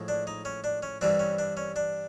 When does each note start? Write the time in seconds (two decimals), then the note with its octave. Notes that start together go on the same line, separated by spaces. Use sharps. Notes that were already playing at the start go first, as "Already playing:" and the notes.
Already playing: A2 F3 G#3
0.08 D4
0.27 D#4
0.45 C#4
0.64 D4
0.83 C#4
1.01 G2 E3 G3 C4 D4
1.19 C#4
1.39 D4
1.57 C#4
1.76 D4